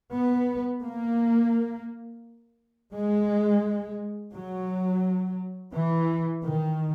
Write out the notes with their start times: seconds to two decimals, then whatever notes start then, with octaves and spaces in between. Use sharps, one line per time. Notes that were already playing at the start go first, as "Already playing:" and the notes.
0.11 B3
0.82 A#3
2.92 G#3
4.32 F#3
5.73 E3
6.44 D#3